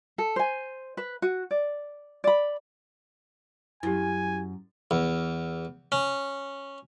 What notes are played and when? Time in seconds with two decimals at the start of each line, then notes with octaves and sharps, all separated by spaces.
0.18 A4
0.36 C5 G#5
0.97 B4
1.22 F#4
1.51 D5
2.24 D5 B5
3.83 F#2 E4 G4 G#5
4.91 E2
5.92 C#4